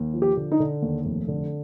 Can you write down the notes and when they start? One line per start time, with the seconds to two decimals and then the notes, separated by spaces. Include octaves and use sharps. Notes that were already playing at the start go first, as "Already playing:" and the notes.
Already playing: D#2
0.13 F3
0.22 G4
0.37 D3
0.52 D#4
0.60 D3
0.82 D#2
1.05 F1
1.28 D3